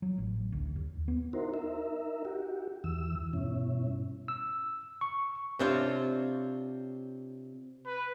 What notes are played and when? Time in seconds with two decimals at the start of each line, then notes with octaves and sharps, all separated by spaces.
0.02 F#3
0.18 A1
0.52 D2
0.76 D#2
1.08 B3
1.33 D#4 E4 F#4 A#4 C5
1.54 D#4 A#4 E5
2.25 F#4 G4
2.84 E2 E3 E6
3.33 G2 B2 C#4 E4
4.28 E6
5.01 C#6
5.59 C3 C4 D4 F4 C5 C#5
7.86 B4